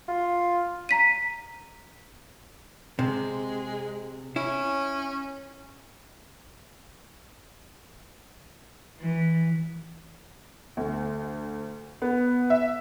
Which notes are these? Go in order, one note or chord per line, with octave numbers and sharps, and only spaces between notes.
F4
A#5 B6 D#7
C3 G#3
C#4 E4
E3
D2
B3
E5